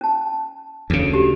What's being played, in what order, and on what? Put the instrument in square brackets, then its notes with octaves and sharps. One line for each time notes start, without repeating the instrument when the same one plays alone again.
[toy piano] C#4 A5
[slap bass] D2 C#3
[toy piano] F#4 G4